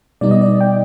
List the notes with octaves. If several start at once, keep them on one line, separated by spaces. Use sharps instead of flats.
B2 G3 B3 D#4 D5
D#5
D5
G5